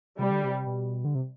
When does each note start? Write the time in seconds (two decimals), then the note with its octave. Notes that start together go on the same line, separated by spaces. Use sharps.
0.18 C3 G3
0.31 D3
0.44 C3
0.66 B2
1.04 D3
1.15 C3